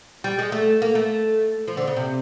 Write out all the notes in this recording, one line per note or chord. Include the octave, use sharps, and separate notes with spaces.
G3
G#3
A3
A#3
A3
F3
D3
C#3
C3